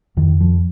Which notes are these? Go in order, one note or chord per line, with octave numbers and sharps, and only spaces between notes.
F2 D#3
F3